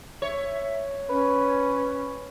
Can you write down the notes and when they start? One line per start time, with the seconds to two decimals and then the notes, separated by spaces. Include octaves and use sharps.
0.22 C#5 E5
1.09 C#4 B4